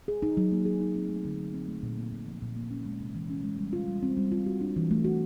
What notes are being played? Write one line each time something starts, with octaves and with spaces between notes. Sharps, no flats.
G#4
D#4
F#3
A#3
G#4
D#4
C4
A3
D3
F#3
C4
A3
A#2
A#3
A#2
F3
A#2
A#3
C#4
G#3
C3
E3
C#4
G#3
G3
F4
G3
C4
G3
F4
F#4
D4
E3
A3
F#4